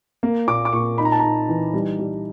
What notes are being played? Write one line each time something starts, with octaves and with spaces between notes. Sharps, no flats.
A#3
A#2 D6
D6
A#2 C#6
D#4 B5
A#5
A5
D#4 A#5
E3
G3
G3